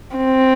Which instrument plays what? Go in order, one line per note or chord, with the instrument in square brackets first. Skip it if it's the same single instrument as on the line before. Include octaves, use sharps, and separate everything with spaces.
[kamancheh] C4